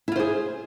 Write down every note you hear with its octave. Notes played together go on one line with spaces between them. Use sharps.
E4 F4 G#4 C5